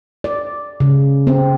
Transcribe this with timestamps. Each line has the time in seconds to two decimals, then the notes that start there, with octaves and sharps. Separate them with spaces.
0.24 D5
0.80 C#3
1.27 C4